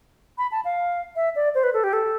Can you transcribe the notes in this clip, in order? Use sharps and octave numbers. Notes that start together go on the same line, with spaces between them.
B5
A5
F5
E5
D5
C5
B4
A4
G4
A4